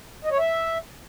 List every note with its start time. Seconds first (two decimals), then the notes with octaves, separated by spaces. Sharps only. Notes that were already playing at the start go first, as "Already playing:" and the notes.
0.25 D#5
0.31 C#5
0.38 E5